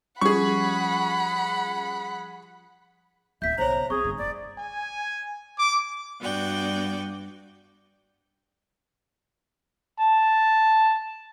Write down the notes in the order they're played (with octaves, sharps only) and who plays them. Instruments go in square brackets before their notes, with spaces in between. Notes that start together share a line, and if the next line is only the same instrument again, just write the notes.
[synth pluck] F3 G3 C#4 [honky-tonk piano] G#4 C#6 [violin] F#5 B5
[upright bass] D1 [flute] E5 [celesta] G6 B6
[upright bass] B1 C#3 [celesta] C5 C#5 [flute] A#5
[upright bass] C4 [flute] G#4 [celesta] C#6
[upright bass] G1 D3
[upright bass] F1 [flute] D5
[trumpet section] G#5
D6
[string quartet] G2 B3 F#4 D5 G5
[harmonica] A5